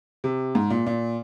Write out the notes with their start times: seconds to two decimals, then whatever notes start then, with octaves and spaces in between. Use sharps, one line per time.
0.24 C3
0.55 G#2
0.70 A#2
0.86 A#2